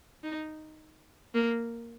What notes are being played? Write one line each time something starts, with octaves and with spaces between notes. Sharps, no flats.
D#4
A#3